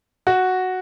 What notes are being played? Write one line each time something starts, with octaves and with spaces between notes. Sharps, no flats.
F#4